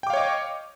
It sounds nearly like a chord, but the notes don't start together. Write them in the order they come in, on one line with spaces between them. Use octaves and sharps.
G5 D6 F5 C#5 D#5